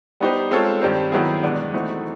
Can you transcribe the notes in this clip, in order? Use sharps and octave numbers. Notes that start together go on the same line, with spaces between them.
G3 B3 D#4 G4 C5
G#3 C4 F4 A4 C#5
G2 D#3 G3 C4
D#3 F#3 B3 E4 G#4
E2 B2 G#3 B3 D4
E3 A3 C4 D#4 F#4